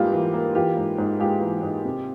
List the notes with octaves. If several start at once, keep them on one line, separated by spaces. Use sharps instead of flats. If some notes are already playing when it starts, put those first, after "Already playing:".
Already playing: G#2 E3 G3 A#3 F4 G4
E3
A#3
E3 F4 G4
G#2
G#2
G#3 F4 G4
E3
G#2
C3